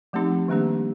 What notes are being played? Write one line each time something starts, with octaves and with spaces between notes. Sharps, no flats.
F3 A3 C4 D#4 G4
D#3 G3 A#3 D4 G4